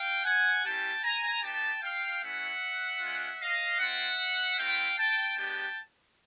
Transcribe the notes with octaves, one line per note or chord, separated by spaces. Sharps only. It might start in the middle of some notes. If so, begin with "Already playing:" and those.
Already playing: F5 G5
F#5 G#5
A#3 C#4 E4 G4 G5 A5
G#5 A#5
B3 D#4 G4 G5 A5
F5 G5
A3 C#4 E4 E5 F#5
G#3 C#4 F4
D#5 F5
C4 F4 E5 F#5
A3 C4 E4 F5 G5
G5 A5
G#3 B3 D4 G4 G5 A5